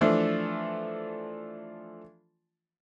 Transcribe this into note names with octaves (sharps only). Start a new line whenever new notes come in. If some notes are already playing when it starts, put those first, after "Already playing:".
E3 F3 A3 D4 F4